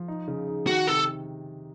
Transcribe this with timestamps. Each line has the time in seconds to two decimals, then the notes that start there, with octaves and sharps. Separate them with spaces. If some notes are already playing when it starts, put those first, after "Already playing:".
Already playing: F3
0.08 D#4
0.28 C#3
0.48 D#4
0.67 D#3 F#4
0.87 C3 A4